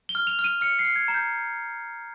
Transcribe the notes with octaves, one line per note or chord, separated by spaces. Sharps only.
G7
F6
F7
F6
D#7
F6 C#7
C7
F6
G#6
A#5
G6